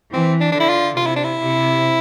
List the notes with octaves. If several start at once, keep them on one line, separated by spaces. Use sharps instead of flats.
E3 C4
D4
D3 D4
E4
F4
C3 F4
E4
D4
E4
C3